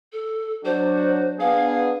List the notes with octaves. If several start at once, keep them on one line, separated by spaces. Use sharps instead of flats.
A4
F#3 D4 F#4 C5
B3 D4 G#4 F5